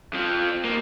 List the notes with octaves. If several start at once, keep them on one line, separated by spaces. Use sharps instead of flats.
F2 F3
D#3 A#3